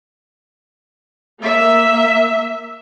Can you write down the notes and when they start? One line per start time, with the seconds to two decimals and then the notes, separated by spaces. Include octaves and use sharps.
1.40 A#3 E5